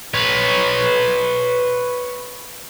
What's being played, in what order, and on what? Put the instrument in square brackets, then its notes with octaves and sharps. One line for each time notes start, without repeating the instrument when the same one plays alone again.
[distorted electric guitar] B4 C#5